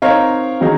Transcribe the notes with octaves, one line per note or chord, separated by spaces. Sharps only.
C4 D#4 A#4 C#5 F5
D#3 F#3 C4 D#4 G#4